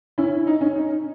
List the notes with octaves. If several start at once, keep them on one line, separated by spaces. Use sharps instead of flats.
C#4 E4
D#4
C#4
D#4